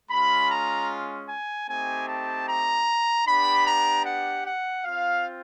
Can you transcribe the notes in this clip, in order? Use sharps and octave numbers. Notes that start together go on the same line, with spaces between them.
G#3 C#4 F4 B5
A#5
G#5
A3 C4 D#4 G4 G#5
A5
A#5
B3 D4 G4 B5
A#5
F#5
F#5
C4 F4 F5